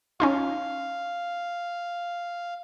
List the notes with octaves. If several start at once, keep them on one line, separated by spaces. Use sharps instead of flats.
C#4 D#4 F4 F5